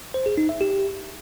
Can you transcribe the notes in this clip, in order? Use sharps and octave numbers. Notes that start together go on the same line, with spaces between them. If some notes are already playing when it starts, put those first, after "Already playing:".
C5
G#4
D#4
E5
G4